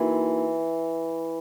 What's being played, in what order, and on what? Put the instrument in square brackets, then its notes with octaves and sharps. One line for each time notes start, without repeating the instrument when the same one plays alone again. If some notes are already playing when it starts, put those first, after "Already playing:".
Already playing: [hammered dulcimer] E3 [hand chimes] A#3 D#4 F#4 A#4